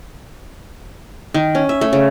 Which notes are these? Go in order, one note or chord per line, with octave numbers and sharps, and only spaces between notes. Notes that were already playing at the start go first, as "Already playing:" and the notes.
D#3
C#4
E5
A3
C#3